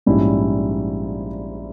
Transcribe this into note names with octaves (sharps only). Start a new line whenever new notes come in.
A#1 G#2 G3 C#4 E4